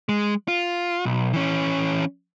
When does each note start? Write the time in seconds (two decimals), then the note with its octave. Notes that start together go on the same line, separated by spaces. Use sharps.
0.09 G#3
0.48 F4
1.05 B1
1.33 E3 C#4